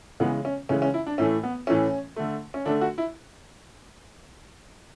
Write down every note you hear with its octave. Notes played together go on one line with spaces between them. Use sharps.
C#3 E3 G#3 B3
C#4
C#3 E3 G#3 C#4
C#4
E4
D4
A2 E3 A3 C#4
B3
A2 E3 A3 C#4
D3 A3
C#4
D3 A3 D4
F#4
E4